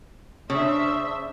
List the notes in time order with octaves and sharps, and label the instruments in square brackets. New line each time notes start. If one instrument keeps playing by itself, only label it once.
[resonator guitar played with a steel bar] C#3 [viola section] D4 C5 E5